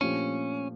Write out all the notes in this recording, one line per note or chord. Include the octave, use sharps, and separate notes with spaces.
A#2 F3 A3 C#4 D4 G4